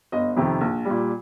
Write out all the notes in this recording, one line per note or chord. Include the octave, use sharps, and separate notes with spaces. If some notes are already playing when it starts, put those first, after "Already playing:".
G1 D#5
F2 C3 D#3
A#1
A#2 G3